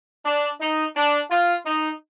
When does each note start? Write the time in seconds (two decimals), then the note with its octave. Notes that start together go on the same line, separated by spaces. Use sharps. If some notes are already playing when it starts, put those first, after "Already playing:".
0.25 D4
0.60 D#4
0.95 D4
1.30 F4
1.65 D#4